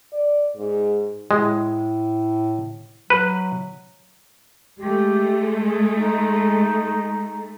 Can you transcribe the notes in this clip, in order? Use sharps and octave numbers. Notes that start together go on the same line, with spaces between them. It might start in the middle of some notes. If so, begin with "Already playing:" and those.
D5
G#2
A2 G#3
F#3 B4
G#3 A3 G4
G#4
D#4